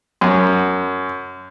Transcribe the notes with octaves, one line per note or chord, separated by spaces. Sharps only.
F#2